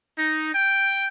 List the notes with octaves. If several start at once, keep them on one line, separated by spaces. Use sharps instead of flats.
D#4
G5